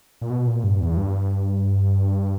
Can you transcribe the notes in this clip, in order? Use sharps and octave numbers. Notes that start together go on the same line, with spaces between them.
A#2
B2
A#2
G2
E2
G2